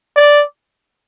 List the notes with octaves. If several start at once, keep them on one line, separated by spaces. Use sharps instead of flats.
D5